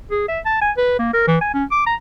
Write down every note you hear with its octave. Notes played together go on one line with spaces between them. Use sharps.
G#4
E5
A5
G#5
B4
A#3
A#4
E3
G#5
C#4
D6
A#5